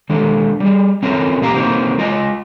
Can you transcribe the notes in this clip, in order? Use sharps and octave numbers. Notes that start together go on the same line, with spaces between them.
D#3 G#3 D4 A4
G3 G#4
A3 C4 C#4 F4 A#4
A#2 A#3 G4 F5 A#5
A#3 C4 D#4 F4 F#4 C5
G#3 F4 D#5 G#5